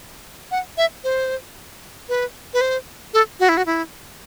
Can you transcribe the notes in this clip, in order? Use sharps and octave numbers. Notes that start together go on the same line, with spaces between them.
F#5
E5
C5
B4
B4
C5
A4
F#4
E4
F#4
E4